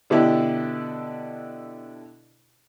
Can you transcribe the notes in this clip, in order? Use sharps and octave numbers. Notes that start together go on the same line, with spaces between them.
B2 D3 D4 E4 G4